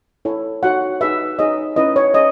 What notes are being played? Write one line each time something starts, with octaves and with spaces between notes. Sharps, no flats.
E4 A4 C#5
D#4 F#4 C#5 F#5
D#4 G#4 B4 E5
D#4 G#4 C#5 D#5
C#4 E4 B4 D#5
C#5
C#4 G#4 D#5